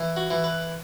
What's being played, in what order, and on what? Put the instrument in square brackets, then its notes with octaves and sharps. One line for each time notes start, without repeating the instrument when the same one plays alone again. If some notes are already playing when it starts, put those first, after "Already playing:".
Already playing: [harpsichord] E3
F#4
E3
B4